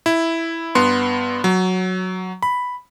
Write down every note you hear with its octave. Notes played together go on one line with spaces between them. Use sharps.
E4
G2 B3 C6
F#3
B5